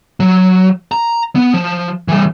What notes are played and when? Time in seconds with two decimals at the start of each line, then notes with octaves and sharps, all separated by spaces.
0.20 F#3
0.92 A#5
1.36 B3
1.54 F3
2.08 E3 G3